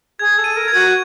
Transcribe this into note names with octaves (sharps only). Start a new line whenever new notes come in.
G#4 G#6
A4
D#7
A#4
G#6
F#4